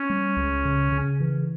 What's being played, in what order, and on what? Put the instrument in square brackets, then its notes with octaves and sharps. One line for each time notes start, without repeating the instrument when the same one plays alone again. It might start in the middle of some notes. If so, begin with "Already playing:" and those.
Already playing: [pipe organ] C#4
[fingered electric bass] G3
C#2
C#3
C#3
E3